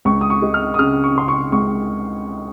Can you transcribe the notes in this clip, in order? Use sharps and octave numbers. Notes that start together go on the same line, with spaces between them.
C#2 C#6
D#6
C#6
G#3
F6
D#6
C#3 F6
C#6
C#3 C6
C#6
C#2 C#6